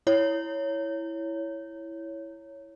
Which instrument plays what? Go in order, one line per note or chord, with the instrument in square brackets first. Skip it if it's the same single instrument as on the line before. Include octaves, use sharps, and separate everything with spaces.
[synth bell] E4 C#5